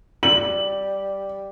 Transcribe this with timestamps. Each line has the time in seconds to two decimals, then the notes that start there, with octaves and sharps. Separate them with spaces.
0.23 G3 F#7